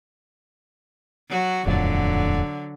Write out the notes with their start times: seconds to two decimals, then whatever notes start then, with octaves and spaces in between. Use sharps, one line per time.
1.29 F#3 F#4
1.66 D#1 F2 A2 D3 F#3